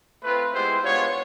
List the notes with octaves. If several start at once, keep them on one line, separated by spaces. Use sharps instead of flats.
A3 C4 F4 B4
G#3 B3 E4 G4 C5
G#3 B3 D4 F4 C#5